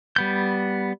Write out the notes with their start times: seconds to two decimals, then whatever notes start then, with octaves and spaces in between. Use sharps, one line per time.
0.16 G3 B3 G6